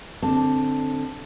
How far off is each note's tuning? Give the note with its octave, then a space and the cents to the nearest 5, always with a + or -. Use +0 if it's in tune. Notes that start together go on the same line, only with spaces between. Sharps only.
D3 +0 C4 +0 A5 +0